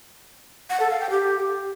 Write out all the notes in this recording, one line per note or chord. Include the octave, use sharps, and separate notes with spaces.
F#5
A4
F5
G5
G4